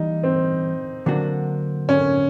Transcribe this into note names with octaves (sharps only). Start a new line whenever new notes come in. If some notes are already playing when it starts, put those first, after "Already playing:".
Already playing: E3 G3 A#3 D#4
C4
D3 F#3 A#3 D4 F#4
C#4